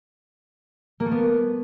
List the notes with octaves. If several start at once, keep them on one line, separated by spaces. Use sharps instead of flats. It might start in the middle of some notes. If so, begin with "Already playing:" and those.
A#3
A3
B3